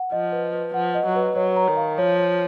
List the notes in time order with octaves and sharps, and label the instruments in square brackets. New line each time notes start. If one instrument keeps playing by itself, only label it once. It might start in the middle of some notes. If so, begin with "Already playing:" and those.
Already playing: [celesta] F#5
[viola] F3 [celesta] D#5
[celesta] B4
B4
[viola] F3 [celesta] F#5
[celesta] D#5
[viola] F#3
[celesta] B4
[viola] F#3 [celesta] C#5
[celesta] A#5
[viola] D#3
[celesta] F5
[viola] F3 [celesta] C#5
[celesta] C#5